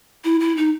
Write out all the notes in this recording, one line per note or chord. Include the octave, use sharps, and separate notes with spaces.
E4
E4
D#4